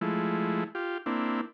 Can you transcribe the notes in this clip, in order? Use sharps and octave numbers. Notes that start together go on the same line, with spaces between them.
F3 G#3 A3 E4
F4 G4
A#3 C4 D4 E4